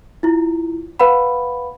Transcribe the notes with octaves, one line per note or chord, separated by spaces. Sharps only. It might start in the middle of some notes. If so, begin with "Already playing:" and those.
E4 F4
B4 F5 F#5 B5